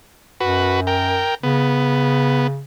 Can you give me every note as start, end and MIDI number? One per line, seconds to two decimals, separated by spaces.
0.40 1.25 42
0.40 0.80 66
0.40 0.80 71
0.87 1.35 70
0.87 1.35 79
1.43 2.64 49
1.43 2.47 59